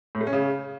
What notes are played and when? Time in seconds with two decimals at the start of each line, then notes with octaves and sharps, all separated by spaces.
0.15 A2
0.21 A3
0.27 C#4
0.33 C#3